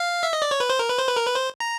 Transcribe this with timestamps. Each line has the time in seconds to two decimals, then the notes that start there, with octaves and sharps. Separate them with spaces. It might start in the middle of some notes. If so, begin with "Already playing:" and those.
Already playing: F5
0.23 E5
0.33 D#5
0.42 D5
0.51 C#5
0.60 B4
0.70 C5
0.79 A#4
0.89 B4
0.98 C5
1.07 B4
1.16 A#4
1.26 B4
1.35 C5
1.60 A#5